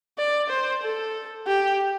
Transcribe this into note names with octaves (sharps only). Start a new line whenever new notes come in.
D5
C5
A4
G4